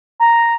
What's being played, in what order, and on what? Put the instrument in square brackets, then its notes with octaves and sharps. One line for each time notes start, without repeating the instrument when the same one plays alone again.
[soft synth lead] A#5